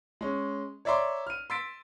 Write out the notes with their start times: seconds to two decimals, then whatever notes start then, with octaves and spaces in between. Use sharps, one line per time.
0.21 G#3 C#4
0.85 C#5 D5 E5 A#5 C6 D6
1.27 F6 D#7
1.50 C6 E6 A6 B6 D7